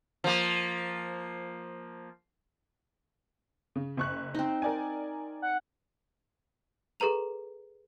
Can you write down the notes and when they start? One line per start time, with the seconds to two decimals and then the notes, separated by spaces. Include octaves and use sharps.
0.24 F3 A#3
3.76 C#3
3.97 F#1 C#6 F#6
4.35 C4 D#4
4.62 A#4 D5 G#5
5.42 F#5
7.00 G#4 A4 B4 A#5 F7